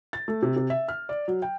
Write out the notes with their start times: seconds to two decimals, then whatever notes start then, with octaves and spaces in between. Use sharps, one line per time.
0.13 A6
0.28 A3
0.42 C3
0.56 C3
0.70 E5
0.88 F6
1.09 D5
1.28 F#3
1.42 G5